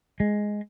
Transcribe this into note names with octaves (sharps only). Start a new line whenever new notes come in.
G#3